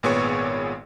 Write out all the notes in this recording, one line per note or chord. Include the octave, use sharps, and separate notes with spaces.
G#1 A#2 B3 G#4 C#5 C#6